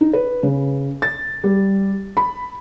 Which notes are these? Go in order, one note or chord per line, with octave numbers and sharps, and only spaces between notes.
D#4
B4
C#3
A6
G3
B5